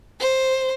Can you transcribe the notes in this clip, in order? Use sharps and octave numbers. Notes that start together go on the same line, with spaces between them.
C5